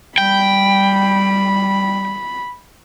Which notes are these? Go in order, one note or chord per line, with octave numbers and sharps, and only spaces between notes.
G3 G5 B5